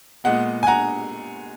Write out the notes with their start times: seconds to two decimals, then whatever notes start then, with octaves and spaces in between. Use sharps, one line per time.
0.24 A#2 G#3 B3 F#5
0.63 G#5
0.67 F#5 A#5